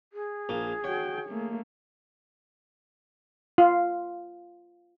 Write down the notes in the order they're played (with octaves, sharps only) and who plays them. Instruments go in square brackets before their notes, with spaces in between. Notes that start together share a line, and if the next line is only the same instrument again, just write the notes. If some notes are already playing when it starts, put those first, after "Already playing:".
[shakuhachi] G#4
[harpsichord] A#1 A#2 F4
[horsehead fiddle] F#4 G5 [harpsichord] C#5
[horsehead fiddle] A3 A#3
[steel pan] F4